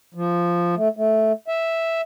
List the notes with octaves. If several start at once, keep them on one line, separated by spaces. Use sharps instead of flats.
F3
A3
A3
E5